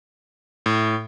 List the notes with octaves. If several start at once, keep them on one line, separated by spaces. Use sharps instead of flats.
A2